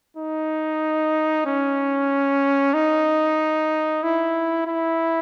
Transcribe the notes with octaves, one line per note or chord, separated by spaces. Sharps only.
D#4
C#4
D#4
E4
E4